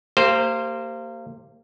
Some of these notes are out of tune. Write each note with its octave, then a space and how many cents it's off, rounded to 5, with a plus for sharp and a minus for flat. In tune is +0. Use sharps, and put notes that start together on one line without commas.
A#3 -30 G4 -5 C5 +0